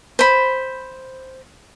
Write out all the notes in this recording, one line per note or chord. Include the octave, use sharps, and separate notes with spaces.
C5 B5